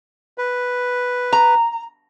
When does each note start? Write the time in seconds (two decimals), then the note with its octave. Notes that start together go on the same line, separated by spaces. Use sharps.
0.38 B4
1.33 A#5